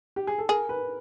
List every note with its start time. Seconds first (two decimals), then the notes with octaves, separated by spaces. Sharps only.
0.16 G4
0.27 G#4
0.38 A4
0.49 G#4 A#4
0.69 B4